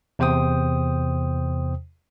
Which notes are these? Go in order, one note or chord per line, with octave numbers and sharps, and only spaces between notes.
E2 C3 C5 G5 D#6